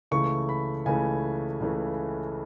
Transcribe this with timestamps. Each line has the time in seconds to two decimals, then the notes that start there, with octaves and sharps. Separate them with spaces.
0.11 C#2 C#3 E3 A3 C#6
0.49 B5
0.85 C#2 C#3 E3 A3 G#5
1.60 C#2 C#3 E3 A3